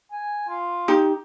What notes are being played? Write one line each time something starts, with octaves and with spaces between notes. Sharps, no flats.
G#5
F4
D#4 G4